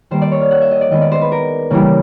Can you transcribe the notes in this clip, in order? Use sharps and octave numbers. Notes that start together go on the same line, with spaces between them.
D#3 G3 A#3 C5
D5
C#5
F5
F#5
E5
D#5
D5
D#3 G#3 B3 D#5
D5
C5
B4
A#4
C#3 E3 G3 A#3